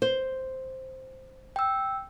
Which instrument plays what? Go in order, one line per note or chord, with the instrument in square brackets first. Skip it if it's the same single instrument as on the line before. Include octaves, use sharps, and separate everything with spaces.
[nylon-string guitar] C5
[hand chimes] G5 E6